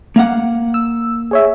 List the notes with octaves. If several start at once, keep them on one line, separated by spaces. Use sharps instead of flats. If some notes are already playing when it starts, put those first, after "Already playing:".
A#3 F5 F#5
E6
G#4 C#5 E5